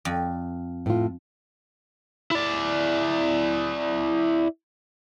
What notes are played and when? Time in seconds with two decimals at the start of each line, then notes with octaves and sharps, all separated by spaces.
0.05 F2
0.86 A2 F4
2.31 E4 D5